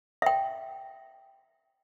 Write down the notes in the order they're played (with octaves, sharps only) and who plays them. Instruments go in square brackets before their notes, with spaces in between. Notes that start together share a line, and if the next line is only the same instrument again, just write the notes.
[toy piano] E5 G5